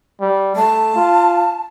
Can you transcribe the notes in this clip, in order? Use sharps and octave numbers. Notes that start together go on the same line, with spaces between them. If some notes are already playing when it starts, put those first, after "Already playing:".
G3
A3 A5
F4